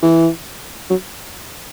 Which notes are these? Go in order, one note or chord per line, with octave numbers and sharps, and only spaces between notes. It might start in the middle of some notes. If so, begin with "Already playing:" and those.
E3
F#3